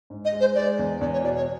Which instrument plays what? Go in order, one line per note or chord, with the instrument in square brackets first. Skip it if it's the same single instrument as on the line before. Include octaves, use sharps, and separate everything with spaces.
[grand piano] G#2
[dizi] D#5
[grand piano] G#3
[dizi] C5
[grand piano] G#3 [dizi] D5
[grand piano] E2
[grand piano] E2 [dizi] D5
[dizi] C#5
[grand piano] B2 [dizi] D5
[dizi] C#5